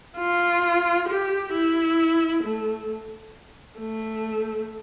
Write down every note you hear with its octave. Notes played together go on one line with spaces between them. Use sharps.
F4
G4
E4
A3
A3